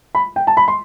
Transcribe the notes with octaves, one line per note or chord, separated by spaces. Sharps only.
B5
G5
A5
B5
C6